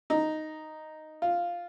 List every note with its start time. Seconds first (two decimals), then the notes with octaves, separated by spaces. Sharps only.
0.10 D#4
1.22 F4